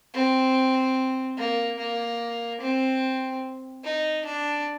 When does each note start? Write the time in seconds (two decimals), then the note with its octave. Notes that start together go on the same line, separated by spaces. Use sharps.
0.14 C4
1.37 A#3
1.78 A#3
2.61 C4
3.84 D#4
4.25 D4